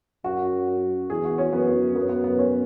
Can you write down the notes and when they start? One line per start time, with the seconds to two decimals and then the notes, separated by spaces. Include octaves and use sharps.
0.24 F#2 F#4
1.10 E2 G#4
1.25 F#4
1.38 C#4
1.53 F#2 B3
1.95 F#2 B3
2.09 B3
2.24 B3
2.38 C#4